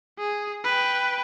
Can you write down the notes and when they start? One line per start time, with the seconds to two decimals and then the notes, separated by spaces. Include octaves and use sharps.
0.19 G#4
0.64 B4 G5